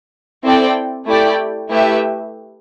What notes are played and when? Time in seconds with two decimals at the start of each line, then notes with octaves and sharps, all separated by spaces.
0.43 C4 E4 A4 D5 G5
1.06 A3 E4 G4 D5 G5
1.70 A3 E4 G4 B4 E5